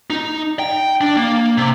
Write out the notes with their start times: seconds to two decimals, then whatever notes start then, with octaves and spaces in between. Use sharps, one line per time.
0.10 D#4
0.59 G5
1.01 D4
1.17 A#3
1.58 C3